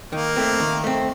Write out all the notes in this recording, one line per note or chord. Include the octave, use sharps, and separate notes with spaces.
D#3 A#3
A3 C4
D#3
A3 C4